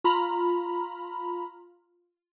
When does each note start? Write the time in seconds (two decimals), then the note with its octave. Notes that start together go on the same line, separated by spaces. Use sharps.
0.04 F4 A#5 B5